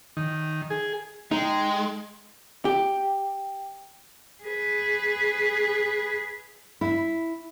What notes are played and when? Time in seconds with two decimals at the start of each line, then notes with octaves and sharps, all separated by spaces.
0.17 D#3
0.70 G#4
1.31 G#3 D#4 D#5 G5
2.65 G4
4.44 G#4 B4
6.81 E4